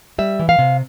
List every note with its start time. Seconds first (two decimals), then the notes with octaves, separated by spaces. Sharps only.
0.18 G3 E5
0.39 E3
0.49 F5
0.59 C3